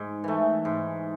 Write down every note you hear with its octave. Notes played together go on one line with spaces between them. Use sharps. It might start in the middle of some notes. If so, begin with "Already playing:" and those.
Already playing: G#2
E3 A3
G#2